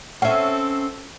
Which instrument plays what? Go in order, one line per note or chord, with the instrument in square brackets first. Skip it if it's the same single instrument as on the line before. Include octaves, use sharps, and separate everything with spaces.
[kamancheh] C4 A4 [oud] C#4 E5 [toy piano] F#5